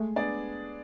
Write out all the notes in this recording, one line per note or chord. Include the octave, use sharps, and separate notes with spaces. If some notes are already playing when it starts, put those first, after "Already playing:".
Already playing: G#3 A3
B3 D4 G#4 D5